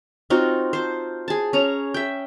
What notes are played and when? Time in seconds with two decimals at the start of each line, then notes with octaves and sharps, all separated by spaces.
0.30 C4 D#4 F4 F#4
0.73 C5 A5
1.28 G#4 A5
1.53 C#4 A#5
1.94 E5 G5